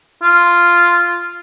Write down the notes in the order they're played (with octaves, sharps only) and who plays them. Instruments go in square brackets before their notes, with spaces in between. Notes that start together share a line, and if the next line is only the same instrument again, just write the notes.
[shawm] F4